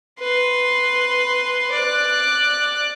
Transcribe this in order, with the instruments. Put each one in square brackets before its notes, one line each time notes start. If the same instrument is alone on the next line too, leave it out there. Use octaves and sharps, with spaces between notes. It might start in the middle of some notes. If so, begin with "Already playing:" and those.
[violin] B4 C6
D5 F#6